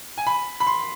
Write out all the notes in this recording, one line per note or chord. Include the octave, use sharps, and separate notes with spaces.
G#5
B5
B5
C6